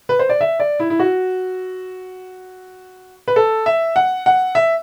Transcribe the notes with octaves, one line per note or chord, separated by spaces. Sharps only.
B4
C5
D5
E5
D5
E4
E4
F#4
B4
A4
E5
F#5
F#5
E5